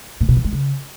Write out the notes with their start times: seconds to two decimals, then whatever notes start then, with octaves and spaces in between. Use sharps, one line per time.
0.21 A#2
0.29 B2
0.37 D#3
0.44 G#3
0.52 C#3